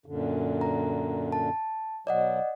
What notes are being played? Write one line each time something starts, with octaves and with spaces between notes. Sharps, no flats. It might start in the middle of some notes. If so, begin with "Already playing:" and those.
F#2 A#2 D3
A#5
A5
B2 F#3 D5 D#5 F#5